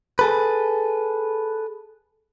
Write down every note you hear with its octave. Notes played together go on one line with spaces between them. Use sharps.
G#4 A4 B4